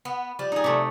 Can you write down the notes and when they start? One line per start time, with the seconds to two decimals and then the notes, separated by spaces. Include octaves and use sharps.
0.05 B3
0.39 F3 G3 D4
0.52 D#4 G#4
0.64 C3 A3